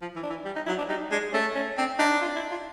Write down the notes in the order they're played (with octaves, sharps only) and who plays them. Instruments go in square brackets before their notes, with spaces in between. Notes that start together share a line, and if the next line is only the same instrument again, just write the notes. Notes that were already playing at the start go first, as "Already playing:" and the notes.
[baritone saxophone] F3
E3
[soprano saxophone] D4
[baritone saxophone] E3
G3
[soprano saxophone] D#4
[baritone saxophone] F#3 [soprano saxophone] E4
[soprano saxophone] D4
[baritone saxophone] G3 [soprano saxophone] D#4
[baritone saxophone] G#3 [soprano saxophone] D4
[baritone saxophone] A3 [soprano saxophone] C#4
[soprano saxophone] C#4
[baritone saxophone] C4 [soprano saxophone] D4
[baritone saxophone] D4 [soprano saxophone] D#4
[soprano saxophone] F4
E4
F4